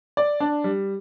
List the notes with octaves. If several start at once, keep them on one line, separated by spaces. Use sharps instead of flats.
D5
D4
G3